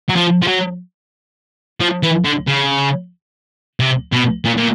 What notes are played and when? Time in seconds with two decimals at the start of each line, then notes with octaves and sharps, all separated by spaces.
0.09 F#3
0.16 F3
0.42 F3
0.48 F#3
1.81 F3
2.03 E3
2.25 D3
2.47 C#3
3.80 C3
4.12 B2
4.45 A#2
4.58 A#2